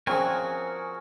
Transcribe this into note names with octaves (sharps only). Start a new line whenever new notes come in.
A#2 F3 C4 C#4 F#4 G#4 A#4 G#5